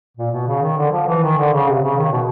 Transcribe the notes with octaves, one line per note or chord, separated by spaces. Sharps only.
A#2
B2
C#3
D#3
D3
F3
E3
D#3
D3
C#3
C3
C#3
D#3
B2